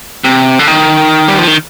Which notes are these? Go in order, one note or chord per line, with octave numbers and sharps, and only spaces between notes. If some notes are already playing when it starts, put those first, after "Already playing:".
C3
D3
D#3
G3
F3
D#3